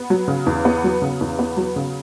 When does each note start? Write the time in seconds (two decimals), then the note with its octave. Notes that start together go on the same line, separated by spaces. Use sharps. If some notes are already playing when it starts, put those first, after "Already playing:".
Already playing: B3
0.10 F#3
0.28 C#3
0.46 E2
0.65 B3
0.84 F#3
1.02 C#3
1.21 E2
1.39 B3
1.57 F#3
1.76 C#3